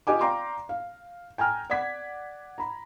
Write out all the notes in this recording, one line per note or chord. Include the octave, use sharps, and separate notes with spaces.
F4 G4 D#5 G#5 D6
D5 F5 G5 A#5 C6 D6
F5
G5 G#5 A#5 F6
D5 F#5 D6 G#6 B6
A#5 B5